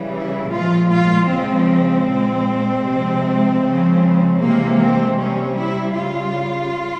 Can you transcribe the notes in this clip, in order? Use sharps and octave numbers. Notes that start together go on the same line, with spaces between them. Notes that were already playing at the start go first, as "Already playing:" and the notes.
Already playing: C#3 E3 G3
E4
A#2 F3 G#3 F4
F4
C#3 F3 G#3 C4
A#2 G#3
C3 F3 G#3
C#3 F3 G#3
C3 E3 G#3 A#3
C4
C3 G3 C#4
E4
C#3 G3 F4